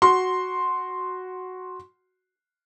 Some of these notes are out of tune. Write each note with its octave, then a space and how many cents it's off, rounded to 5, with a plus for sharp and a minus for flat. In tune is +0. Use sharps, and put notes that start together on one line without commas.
F#4 +0 C6 +0